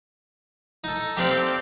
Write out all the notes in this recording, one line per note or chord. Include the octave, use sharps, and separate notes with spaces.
D#4 A4
C4 G4 A4 D5 F5